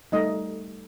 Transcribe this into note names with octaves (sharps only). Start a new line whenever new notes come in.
G3 A3 D#4 D#5